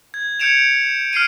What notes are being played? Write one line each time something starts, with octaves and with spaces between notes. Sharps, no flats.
G#6
G6 G#6 C#7 D7 E7 F7
F6 C7 D7 D#7